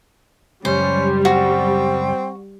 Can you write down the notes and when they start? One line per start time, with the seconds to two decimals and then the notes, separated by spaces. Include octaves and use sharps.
0.65 C#2 F#2 G3 C#4 C5
1.25 C4 F#4